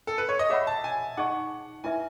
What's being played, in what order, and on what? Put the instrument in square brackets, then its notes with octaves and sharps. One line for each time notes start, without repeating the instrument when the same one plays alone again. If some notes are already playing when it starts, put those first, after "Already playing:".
[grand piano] A4
B4
C#5
D#5
[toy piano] G#4 C#5 F#5 B5 [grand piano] E5
[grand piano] A5
G#5
[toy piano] D#4 G#4 D#5 A5 C#6 [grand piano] F#5
[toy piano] E4 B4 E5 [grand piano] G#5